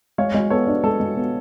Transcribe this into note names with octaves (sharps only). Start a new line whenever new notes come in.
G#3 C#5 F5
G#3
B3 A4 C#5
D4
G#3 A4
G#3
B3